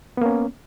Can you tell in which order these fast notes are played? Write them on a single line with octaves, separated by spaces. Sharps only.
B3 A#3 C#4